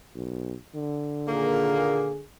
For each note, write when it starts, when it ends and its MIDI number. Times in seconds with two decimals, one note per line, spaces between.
0.15 0.54 35
0.75 2.24 50
1.28 2.08 46
1.28 2.08 51
1.28 2.08 58
1.28 2.20 68